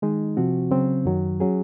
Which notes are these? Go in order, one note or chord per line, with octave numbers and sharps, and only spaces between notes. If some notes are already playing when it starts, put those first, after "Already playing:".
D#3 G#3 D#4
C3 F3 C4 F#4
C#3 F#3 C4
F#2 D#3 F#3
F#3 C#4 G#4